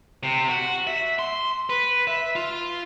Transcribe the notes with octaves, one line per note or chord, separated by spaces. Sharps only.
C3
F#4
E5
C6
B4
E5
F4